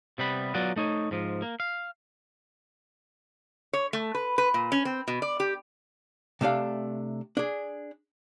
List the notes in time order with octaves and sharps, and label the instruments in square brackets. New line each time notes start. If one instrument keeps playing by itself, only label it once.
[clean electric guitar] C3 G3 B3 B5
F#3 B3 F4 D5 F#5
A3 D#4 C#5
G#2 F3
A#3
F5
[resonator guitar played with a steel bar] C#5
A3
B4
B4
A#2
C#4
C4
B2
D5
G4
[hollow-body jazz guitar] C3 A3 D4 F5
D4 G#4